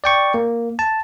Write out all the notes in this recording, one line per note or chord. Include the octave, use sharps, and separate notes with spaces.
D5 G5 C#6
A#3
A5